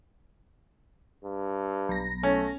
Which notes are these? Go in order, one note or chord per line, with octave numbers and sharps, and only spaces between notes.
G2
B1 A#6
A3 C#4